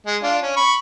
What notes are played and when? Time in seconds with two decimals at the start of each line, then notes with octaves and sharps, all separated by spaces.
0.06 G#3
0.23 D4 F4
0.42 C#4
0.56 B5 C#6